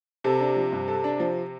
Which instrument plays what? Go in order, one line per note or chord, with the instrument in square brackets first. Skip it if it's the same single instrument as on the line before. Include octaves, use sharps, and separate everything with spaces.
[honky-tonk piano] C3 [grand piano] A4
[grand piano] D4
F3
G2
A4
D4
F3